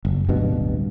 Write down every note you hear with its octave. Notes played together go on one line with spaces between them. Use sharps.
F#1
D1 G1 G2 B2